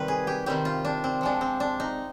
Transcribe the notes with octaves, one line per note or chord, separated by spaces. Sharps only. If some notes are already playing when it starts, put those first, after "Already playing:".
Already playing: C3 D#3 G3 C4 B4
G#4
G4
C3 D#3 G3 C4 G4
F4
D4
C4
C3 F3 G#3 D4
C4
D4
D#4